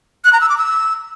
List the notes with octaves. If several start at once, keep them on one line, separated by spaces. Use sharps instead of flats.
F#6
A#5
E6
D6
E6